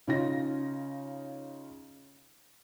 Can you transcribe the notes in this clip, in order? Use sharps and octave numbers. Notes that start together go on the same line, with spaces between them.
C#3 C#4 D#4 F4 A#6